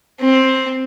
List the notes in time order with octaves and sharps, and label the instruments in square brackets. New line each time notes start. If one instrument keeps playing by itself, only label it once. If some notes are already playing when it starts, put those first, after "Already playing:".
[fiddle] C4